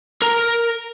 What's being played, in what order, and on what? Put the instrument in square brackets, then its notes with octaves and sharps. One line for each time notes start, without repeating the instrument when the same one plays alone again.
[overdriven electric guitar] A#4 A#5